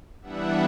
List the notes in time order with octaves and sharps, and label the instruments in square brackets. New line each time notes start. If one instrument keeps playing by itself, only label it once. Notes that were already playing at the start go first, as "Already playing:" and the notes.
[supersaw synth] E3 G3 B3 D4 E5 F#5